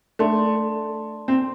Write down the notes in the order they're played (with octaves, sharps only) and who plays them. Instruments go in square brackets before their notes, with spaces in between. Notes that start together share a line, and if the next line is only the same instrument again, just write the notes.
[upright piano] A3 [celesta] D4 A4 D5 A5 C6
[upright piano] C4